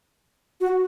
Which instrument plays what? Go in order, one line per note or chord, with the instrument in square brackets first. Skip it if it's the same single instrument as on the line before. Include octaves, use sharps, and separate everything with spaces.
[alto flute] F#4